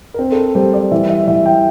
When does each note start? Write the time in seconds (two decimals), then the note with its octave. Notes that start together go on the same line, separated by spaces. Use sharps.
0.14 A#4
0.19 C4 C5
0.32 A4
0.37 A#4
0.55 G3 C5
0.74 D5
0.92 E3 E5
1.10 E5
1.28 E3 E5
1.46 G5